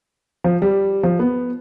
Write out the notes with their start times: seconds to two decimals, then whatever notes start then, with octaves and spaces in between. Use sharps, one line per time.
0.44 F3
0.62 G3
1.03 F3
1.19 B3